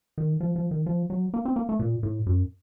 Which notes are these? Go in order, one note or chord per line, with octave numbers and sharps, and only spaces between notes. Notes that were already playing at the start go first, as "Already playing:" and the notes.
D#3
F3
F3
D#3
F3
F#3
A#3
C4
A#3
A3
A#2
A2
F#2